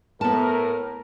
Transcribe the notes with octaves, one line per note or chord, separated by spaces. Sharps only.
A2 B3 A#4 A5